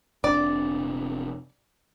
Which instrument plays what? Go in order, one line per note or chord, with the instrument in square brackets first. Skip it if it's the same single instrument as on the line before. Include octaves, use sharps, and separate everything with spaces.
[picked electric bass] F1 C3 D4 [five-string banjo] D5